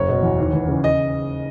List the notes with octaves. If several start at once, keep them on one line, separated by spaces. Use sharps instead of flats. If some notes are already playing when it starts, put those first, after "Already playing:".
Already playing: F#1 C#5
B2
E2
D#2
E3
C#3
D#5